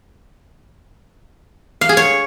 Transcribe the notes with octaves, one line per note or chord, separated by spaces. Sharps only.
F5
G#4
C#5